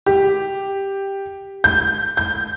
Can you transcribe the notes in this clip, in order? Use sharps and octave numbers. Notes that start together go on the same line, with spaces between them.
G4
G6
G6